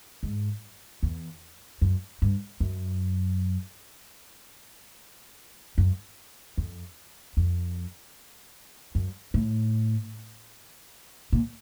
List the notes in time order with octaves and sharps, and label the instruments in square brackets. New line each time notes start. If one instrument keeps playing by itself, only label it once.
[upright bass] G#2
E2
F#2
G2
F#2
F#2
F2
F2
F#2
A2
A#2